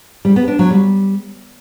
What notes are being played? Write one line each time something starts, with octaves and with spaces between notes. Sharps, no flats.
G3
B3
D4
F#3
G3